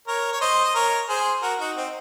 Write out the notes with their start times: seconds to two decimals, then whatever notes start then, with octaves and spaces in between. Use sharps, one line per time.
0.08 A#4 C#5
0.32 C#5
0.41 C5 D#5
0.64 D#5
0.75 A#4 C#5
1.09 G#4 C5
1.42 F#4 A#4
1.60 D#4 F#4
1.77 C4 D#4